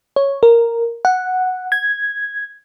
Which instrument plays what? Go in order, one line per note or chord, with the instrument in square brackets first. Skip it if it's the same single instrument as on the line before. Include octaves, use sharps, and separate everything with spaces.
[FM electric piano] C#5
A#4
F#5
G#6